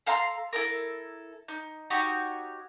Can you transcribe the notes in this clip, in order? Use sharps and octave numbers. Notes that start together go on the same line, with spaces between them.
A4 F5 A#5 C6
E4 A4 A#4
D#4
D#4 F#4 G4 C#5